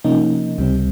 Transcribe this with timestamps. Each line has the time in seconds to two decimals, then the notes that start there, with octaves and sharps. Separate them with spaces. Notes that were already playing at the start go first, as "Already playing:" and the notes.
0.04 C3 F3 A#3 C#4 D#4
0.58 C#2 C3 G3 C4